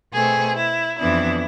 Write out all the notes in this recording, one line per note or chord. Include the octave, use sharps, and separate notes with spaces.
B2 A3 C4 G#4
E4
F2 E3 B3 D4 E4